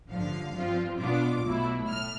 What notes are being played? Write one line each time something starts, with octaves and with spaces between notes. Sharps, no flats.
A1 G2 D3 F3 F5
G2 F3 C4 F4
B2 B3 D4 F4 D6
B1 B2 A3 E4
A2 F6